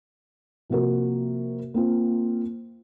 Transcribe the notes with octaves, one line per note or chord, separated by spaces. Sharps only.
C3 F3 A#3 F#4 A#4
A#3 C4 F4